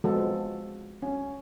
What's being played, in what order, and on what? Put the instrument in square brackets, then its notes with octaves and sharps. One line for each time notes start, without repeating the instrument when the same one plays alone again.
[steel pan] F3 G#3 B3 F#4 A4
C#4